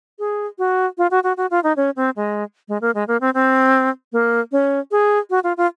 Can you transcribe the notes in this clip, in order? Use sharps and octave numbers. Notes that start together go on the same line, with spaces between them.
G#4
F#4
F4
F#4
F#4
F#4
F4
D#4
C#4
C4
G#3
G#3
A#3
G#3
A#3
C4
C4
A#3
C#4
G#4
F#4
F4
F4